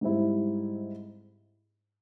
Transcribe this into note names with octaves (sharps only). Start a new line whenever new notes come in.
G#2 G3 C4 E4